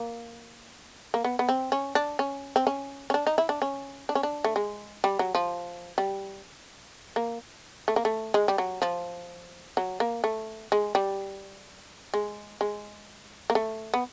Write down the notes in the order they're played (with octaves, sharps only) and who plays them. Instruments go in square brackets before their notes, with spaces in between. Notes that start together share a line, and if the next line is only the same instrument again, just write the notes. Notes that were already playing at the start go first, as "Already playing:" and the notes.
Already playing: [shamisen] A#3
A#3
B3
B3
C4
C#4
D4
C#4
C4
C#4
C#4
D4
D#4
E4
D4
C#4
D4
C#4
D4
A3
G#3
G3
F#3
F3
G3
A#3
A3
A#3
A3
G#3
G3
F#3
F3
F#3
A#3
A3
G#3
G3
G#3
G#3
A#3
A3
B3